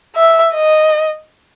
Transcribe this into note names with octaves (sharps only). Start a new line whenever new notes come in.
E5
D#5